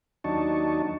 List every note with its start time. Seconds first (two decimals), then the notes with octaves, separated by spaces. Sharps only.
0.24 D#2 F#3 D4 D#4 A5 C#6